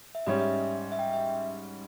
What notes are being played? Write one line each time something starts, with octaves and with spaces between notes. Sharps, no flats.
E5
G#2 G3 C#4 D#5
E5
E5
G5
E5